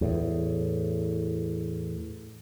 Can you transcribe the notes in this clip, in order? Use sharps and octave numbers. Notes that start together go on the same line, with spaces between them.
E2 A2